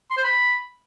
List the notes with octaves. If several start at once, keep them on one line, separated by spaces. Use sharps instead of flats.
C6
C5
B5